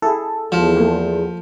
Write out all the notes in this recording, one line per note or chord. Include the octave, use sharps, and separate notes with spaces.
E4 G#4 A4
E2 F3
A3 A#3 C4